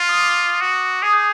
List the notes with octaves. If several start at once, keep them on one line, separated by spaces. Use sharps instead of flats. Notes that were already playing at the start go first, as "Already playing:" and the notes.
Already playing: F4
D#6
D6
F#4
G#4 D#6
G6